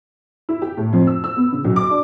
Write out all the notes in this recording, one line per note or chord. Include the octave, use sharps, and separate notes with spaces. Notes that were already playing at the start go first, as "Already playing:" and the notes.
E4
G4
A2
F2
E6
E6
B3
C#3
B1
D6
D4